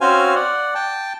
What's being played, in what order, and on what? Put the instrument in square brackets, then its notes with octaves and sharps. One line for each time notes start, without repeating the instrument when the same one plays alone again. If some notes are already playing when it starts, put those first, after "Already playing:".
[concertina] C4 C#4 F#4 C5 F5 G#5
D5 F#5
G5 A5